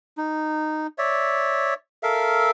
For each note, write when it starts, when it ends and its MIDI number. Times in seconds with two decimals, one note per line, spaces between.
0.18 0.87 63
0.98 1.74 73
0.98 1.74 74
0.98 1.74 76
2.03 2.51 69
2.03 2.51 70
2.03 2.51 76
2.03 2.51 77